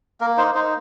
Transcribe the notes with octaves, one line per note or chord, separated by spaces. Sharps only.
A#3 A#4
D#4 C5
D#4 C5